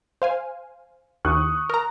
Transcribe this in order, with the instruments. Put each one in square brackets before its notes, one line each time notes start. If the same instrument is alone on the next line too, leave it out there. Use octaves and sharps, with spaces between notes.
[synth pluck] C5 F5 G#5
[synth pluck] D#2 [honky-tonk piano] C#6 D#6 F#6
[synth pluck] A#4 A#5